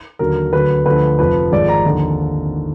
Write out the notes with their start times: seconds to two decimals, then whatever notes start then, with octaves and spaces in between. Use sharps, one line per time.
0.19 D#2 D3 F#3 A#4
0.52 D2 D3 F#3 B4
0.85 D2 D3 F3 B4
1.19 F1 F2 F3 B4
1.51 G#1 G#2 F3 D5
1.68 A#5
1.85 D#2 D3 F3